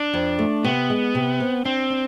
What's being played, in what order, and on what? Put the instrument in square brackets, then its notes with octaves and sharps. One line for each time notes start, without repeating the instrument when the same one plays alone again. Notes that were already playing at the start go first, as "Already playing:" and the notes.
Already playing: [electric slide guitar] D4
[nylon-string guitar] F2
A3
[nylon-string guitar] C3 [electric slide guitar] B3
[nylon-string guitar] G#3
C3
C4
[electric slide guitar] C4 [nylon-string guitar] D4
[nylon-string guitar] D4